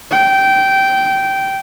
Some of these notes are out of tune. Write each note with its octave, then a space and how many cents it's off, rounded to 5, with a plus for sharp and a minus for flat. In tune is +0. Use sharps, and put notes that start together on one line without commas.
G5 -15